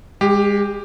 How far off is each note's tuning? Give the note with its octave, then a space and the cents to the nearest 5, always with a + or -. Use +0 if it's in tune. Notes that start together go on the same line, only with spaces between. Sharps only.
G#3 -35 G4 +5